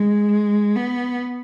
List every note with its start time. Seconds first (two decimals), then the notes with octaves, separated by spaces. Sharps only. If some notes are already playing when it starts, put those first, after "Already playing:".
Already playing: G#3
0.76 B3